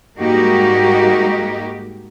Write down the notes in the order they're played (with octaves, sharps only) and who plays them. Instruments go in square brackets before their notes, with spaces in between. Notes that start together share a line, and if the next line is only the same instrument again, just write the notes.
[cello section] G#2 G3 A#3 D#4 F#4 G4